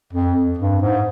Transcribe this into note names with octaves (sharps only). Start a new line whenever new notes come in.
F2
G2
G#2